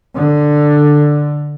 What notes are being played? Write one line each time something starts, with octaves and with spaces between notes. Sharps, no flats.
D3